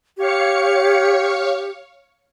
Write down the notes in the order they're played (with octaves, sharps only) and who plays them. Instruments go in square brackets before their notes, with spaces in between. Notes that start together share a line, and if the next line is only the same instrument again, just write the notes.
[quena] G4 [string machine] C#5 F5 C#7